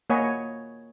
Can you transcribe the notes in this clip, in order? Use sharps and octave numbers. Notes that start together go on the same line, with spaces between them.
A#3 C#5 D#5 F#5 G#5 B5